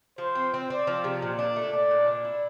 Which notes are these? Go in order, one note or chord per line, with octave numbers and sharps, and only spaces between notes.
F3 C5
C4
C4
C4 D5
F3
C3
A#2
D4
A3
D4 D5
A#2
D4
E4